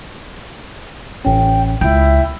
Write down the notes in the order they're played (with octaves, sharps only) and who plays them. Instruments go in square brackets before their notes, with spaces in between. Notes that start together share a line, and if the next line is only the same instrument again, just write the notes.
[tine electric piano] A1 C#4 [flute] G5
[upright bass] C#2 [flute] E4 [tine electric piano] G5